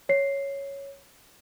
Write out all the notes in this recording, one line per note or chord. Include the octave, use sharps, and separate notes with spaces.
C#5 C7